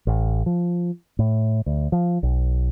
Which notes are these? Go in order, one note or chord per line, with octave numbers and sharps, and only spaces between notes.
A1
F3
A2
D2
F3
B1